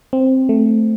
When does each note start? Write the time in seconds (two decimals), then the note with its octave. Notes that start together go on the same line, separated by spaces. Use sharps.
0.13 C4
0.49 A3